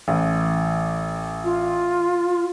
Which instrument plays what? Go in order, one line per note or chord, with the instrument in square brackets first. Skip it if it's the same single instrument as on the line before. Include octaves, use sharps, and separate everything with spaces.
[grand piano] A1
[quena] F4